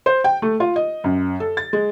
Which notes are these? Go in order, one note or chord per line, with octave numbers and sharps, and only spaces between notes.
C5
G5
A3
F4
D#5
F#2
A4
A6
G#3